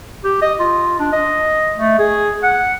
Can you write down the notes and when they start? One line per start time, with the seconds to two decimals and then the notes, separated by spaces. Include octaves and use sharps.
0.24 G4
0.42 D#5
0.60 F4
1.00 D4
1.13 D#5
1.78 A3
1.99 G#4
2.43 F#5